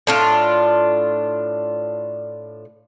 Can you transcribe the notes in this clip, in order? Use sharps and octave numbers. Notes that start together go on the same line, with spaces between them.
A2 D4 F4